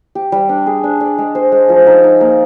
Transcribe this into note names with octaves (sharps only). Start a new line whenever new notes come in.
G4
G3
D4
G#4
D4
D5
G#3
C5
G#3
F3
D#4
D#4
A#3